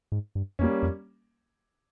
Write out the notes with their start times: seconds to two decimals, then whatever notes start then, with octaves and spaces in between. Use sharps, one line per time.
0.12 G#2
0.35 G2
0.59 F2 G3 A#3 C#4
0.83 F2